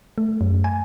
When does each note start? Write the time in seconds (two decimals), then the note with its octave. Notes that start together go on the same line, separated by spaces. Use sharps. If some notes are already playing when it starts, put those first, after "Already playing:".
0.18 A3
0.41 F#2
0.64 G#5